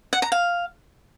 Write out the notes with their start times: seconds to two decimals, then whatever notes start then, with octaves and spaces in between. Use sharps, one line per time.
0.13 F#5
0.22 A#5
0.32 F5